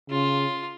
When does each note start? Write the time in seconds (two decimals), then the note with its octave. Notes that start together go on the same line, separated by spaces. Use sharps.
0.10 C#3 F4